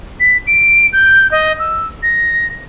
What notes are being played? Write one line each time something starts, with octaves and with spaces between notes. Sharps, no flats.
B6
D7
G6
D#5
E6
A#6